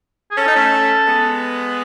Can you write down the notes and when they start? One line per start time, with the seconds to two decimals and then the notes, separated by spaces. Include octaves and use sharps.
0.31 G#4
0.37 C#4 A4
0.47 D#4
0.56 A3 C#4
1.07 G#3 B3